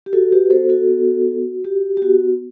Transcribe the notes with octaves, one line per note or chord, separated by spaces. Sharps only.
G4
F#4 A4
G4 B4
B3 A4 C5
F#4 A4
B3
F#4
F#4 G4
G4
B3 F#4